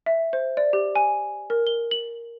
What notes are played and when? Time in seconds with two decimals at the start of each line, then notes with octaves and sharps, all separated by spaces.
0.06 E5
0.33 C5
0.57 D5
0.73 G4
0.95 G#5
1.50 A#4
1.67 G7
1.91 F#7